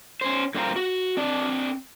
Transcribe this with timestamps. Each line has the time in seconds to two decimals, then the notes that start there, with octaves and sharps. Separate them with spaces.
0.21 C#4 C5
0.55 G2 A#3 C4 F4 A#5
0.76 F#4
1.17 C4 D4 D5